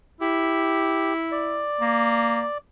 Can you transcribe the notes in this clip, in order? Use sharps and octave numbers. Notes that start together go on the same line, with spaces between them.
E4 G4
D5
A#3